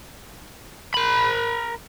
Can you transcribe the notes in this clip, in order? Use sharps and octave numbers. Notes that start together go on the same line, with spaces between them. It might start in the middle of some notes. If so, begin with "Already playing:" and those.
A#4 B5